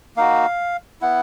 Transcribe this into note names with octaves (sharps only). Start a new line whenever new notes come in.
A#3 D#4 F#4 F5
B3 E4 F#5